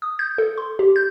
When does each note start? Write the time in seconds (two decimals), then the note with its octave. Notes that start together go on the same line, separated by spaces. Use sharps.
0.02 D#6
0.19 G6
0.38 A4
0.58 C6
0.79 G4
0.96 G6